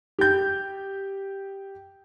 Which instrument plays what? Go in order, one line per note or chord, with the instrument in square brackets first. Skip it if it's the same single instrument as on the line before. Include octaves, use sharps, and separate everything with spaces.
[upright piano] G4 G6